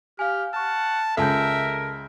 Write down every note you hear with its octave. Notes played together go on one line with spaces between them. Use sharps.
G4 F5 G#5 F6
F#5 A5 C#6 F6
C#2 A4 A#4 E5 A5 G6